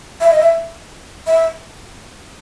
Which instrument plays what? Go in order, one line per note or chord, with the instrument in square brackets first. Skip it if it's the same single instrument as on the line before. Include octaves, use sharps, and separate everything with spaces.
[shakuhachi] E5
D#5
E5
E5